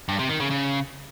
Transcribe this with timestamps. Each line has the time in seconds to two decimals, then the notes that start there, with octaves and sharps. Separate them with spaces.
0.09 G2
0.19 C3
0.29 D#3
0.40 C#3
0.50 C#3